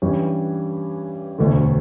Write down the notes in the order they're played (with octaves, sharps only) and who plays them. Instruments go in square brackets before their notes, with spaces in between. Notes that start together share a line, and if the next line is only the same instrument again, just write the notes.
[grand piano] G2 E3 G3 C#4
E1 D2 D3